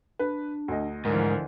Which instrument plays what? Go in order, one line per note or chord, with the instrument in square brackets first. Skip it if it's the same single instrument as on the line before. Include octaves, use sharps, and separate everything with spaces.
[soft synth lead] D4 [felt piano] B4
[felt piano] D2 D#5
[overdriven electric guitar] G#2 [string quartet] D3 E3 F3 [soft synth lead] A#4